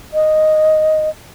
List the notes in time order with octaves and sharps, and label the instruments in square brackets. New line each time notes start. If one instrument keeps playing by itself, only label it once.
[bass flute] D#5